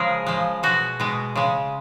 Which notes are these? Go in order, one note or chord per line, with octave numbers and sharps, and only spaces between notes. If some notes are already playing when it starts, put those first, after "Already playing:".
Already playing: C#3 F3 G#3 G#4 A#4
C#3 F3 G#3
B2 G#3 F#4
B2 G#3
C#3 G#3